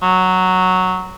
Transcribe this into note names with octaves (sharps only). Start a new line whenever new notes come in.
F#3